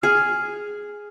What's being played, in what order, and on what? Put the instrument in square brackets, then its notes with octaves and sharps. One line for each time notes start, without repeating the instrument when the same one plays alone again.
[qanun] G#4 [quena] F6